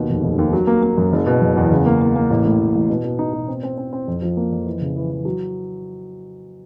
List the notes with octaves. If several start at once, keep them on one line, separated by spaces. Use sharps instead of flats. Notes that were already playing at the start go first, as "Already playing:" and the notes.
Already playing: D#2 B2
F1
F1
D#2
F#3
A#3
A#3
F#2
F#1
B2
F#1
E2
C#3
A#3
A#3
A#3
A1
A2
A1
A1
B2
B2
D#4
B2
C4
C4
C4
C4
F2
F3
A#3
F2
E3
C#3
E3
E3
F#3